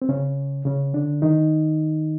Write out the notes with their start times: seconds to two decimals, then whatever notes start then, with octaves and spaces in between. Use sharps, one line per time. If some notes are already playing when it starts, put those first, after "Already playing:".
0.02 C4
0.09 C#3 C#4
0.65 C#3 C#4
0.94 D3 D4
1.22 D#3 D#4